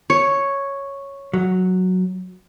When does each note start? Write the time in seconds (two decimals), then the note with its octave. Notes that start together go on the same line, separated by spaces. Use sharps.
0.10 C#5
1.33 F#3